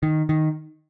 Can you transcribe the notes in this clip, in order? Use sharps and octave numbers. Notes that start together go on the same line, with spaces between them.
D#3
D#3